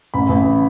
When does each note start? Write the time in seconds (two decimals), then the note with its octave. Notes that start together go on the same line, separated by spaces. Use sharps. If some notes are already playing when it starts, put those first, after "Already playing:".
0.14 A1 B5
0.29 A1